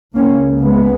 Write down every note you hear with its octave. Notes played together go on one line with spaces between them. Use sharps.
C#2 C#3 A#3 C#4
G#3 B3